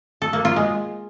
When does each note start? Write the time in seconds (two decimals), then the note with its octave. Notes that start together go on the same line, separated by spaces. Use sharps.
0.22 A4
0.33 A#3
0.45 F4
0.56 G#3